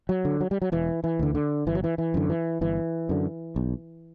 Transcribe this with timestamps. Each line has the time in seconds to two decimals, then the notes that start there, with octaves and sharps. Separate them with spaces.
0.09 F#3
0.25 D3
0.41 F#3
0.51 G3
0.62 F#3
0.72 E1 E3
1.04 E3
1.19 D2 D3
1.35 D3
1.67 G1 E3
1.75 F#3
1.84 E3
1.98 E3
2.14 F#2 D3
2.29 E3
2.61 G1 E3
3.09 F#2 D3
3.56 B1